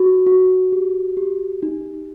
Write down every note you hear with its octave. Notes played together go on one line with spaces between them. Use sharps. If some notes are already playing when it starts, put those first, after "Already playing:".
Already playing: F#4
F#4
G4
G4
D#4